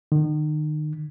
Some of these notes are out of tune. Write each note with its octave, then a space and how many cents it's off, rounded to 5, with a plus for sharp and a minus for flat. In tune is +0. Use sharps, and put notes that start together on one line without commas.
D#3 -35